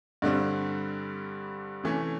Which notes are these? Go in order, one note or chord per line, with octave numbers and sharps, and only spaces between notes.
G2 D3 G3 C4
C3 E3 A3 C#4